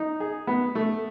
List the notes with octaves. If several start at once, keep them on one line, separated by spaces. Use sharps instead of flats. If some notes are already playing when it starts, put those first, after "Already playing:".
Already playing: D#4
G#4
B3
A3